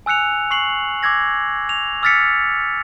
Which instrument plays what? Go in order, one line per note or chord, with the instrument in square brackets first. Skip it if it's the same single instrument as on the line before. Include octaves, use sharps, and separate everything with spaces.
[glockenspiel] G#5 E6 F#6 C#7 F7
C#6 C7 F#7
D6 E6 G#6 A#6
F7
D6 E6 F6 A6 B6 C#7